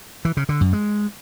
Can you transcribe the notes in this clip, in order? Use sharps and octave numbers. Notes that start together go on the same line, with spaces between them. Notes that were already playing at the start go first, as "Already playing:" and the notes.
E3
C#3
D3
F#2
G#3